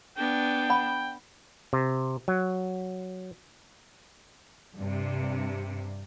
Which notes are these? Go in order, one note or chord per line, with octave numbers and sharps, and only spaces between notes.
B3 D4 G5
F#5 B5
C3
F#3
G2 C3